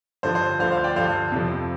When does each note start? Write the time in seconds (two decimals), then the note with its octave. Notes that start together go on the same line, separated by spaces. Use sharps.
0.23 G2 D3 F3 C5
0.35 C5
0.59 D2 D3 F3 C5 F5
0.71 C5 F5
0.84 D5 G5
0.96 G2 D3 F3 C5 F5
1.31 F2 C3 F3